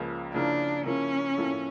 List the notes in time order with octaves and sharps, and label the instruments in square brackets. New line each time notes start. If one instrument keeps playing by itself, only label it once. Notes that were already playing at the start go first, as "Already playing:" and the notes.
Already playing: [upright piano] C#2 C#3 F3 A#3
[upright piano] C#3 F3 A#3 E4 A#4 [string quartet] D4
[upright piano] C#3 F3 A#3 E4 A#4 [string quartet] C#4
[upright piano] A2 F3 A#3 E4 A4